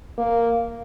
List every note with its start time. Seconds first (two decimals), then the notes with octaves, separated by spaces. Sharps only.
0.18 A#3